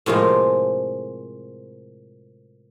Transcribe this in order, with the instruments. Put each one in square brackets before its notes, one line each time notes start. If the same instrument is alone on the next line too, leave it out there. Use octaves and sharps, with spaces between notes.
[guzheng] A2 C3 F3 G#3 A#3